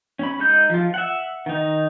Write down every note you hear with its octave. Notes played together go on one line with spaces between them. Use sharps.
C#4 B5
G#3 D#4 G6
F3 F4
E5 F#5
D#3 D#4